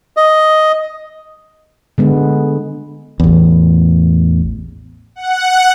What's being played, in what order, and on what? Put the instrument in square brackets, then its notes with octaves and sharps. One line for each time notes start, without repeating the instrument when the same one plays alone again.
[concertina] D#5
[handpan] D3 G#3 B3
[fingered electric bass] A1 E2
[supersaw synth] F#5